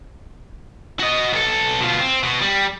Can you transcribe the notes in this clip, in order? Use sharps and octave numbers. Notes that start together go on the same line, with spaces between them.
F#4 D#5
B1 A4
B2 F4
C4
B2
G3